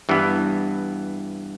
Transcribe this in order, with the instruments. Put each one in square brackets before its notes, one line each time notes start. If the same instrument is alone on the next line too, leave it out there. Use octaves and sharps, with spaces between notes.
[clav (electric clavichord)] G2 E3 B3